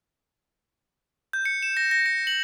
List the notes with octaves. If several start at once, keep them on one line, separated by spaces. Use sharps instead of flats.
G6
C#7
E7
A#6
A#6
C#7
F#7